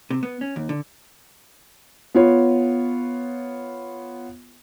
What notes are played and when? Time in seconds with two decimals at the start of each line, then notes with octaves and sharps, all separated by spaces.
0.10 C3
0.23 B3
0.41 C#4
0.56 D#2
0.69 D3
2.14 B3 F4 C#5